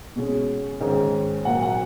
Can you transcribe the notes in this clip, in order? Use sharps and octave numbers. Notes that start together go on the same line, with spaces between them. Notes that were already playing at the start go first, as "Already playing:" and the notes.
B2 G#3 C#4
G#2 D#3 G#3 C#4
A#2 F#3 A#3 F#5
F#5